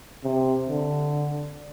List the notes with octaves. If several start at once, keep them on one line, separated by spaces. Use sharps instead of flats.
C3
D3